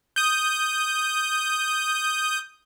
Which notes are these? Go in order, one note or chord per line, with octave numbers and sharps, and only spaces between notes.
D#6 G6